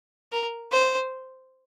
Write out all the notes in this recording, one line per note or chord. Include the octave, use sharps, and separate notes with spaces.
A#4
C5